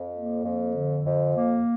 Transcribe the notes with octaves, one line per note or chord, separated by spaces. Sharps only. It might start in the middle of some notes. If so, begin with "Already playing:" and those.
Already playing: F2
A#3
F2
D3
F2
A#3